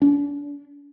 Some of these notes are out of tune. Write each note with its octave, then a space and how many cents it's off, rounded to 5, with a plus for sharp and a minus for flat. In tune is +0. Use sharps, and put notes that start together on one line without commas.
D4 -40